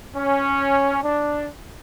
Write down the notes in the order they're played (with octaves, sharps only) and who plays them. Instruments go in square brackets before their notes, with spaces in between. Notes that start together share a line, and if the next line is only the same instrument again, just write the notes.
[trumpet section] C#4
D4